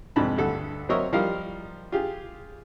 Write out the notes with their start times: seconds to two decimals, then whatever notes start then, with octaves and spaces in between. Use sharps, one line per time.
0.16 C2 F2 G#2 A5 B5
0.38 D2 G2 A4 F#5
0.89 F#3 C4 A#4 C#5 D#5 E5
1.12 F3 G3 A#4 D#5 F5
1.92 F4 G4 G#4